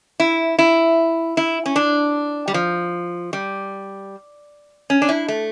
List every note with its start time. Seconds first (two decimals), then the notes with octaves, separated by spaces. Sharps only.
0.20 E4
0.59 E4
1.37 E4
1.66 C#4
1.76 D4
2.48 G3
2.54 F3
3.33 G3
4.90 C#4
5.02 D4
5.09 E4
5.28 A3